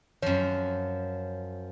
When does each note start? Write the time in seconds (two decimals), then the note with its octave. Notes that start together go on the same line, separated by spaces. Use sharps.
0.22 F#2 F3 C#5